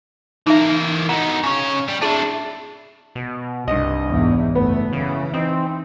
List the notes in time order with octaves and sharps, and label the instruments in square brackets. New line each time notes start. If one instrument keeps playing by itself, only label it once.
[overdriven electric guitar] E3 A#4 [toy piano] D#4 E5
[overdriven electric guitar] B3 D#4 [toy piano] A#5
[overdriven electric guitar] C#3 C#5
G3
[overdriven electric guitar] D4 E4 [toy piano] G#4 A5
[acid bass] B2
[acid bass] C2 [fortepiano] G2 D#5
[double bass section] E2 G#2
[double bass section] F#1 A3 [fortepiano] B3
[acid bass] C#3 [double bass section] E3
[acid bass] C4 [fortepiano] D#4